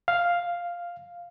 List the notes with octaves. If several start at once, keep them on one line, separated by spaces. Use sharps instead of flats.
F5